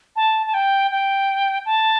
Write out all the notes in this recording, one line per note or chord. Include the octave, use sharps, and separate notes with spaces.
A5
A5
G5
G5
A5